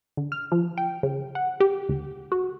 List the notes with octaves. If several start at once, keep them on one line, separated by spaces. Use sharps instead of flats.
D3
F6
F3
G5
C#3
F#5
G4
D2
F#4